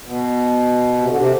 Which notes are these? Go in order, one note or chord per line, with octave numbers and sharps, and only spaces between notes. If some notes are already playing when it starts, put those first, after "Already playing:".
B2
C3
D3
C3